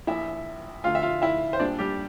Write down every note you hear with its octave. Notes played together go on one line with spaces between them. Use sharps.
A#1 A#2 F3 E4 E5
D2 D3 F3 F4 F5
E5
F4 F5
E4 E5
C5
A#1 A#2 G3 D4 D5
G3 G4